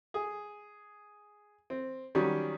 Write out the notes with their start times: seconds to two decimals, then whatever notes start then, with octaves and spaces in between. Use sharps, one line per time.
0.14 G#4
1.70 C4
2.15 D#3 F#3 G3 C#4